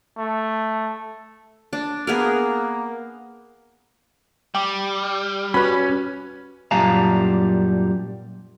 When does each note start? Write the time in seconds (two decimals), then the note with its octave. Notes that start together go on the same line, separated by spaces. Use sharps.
0.18 A3
1.73 D4
2.07 A#3 B3 G#4 A#4
4.55 G3 G5 D6
5.54 C#4 F#4 B4 B5
6.71 F#2 A#2 G3 F5 A5 A#5